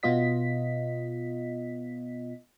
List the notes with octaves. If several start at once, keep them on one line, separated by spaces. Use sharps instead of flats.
B2 B3 F4 D#5 B6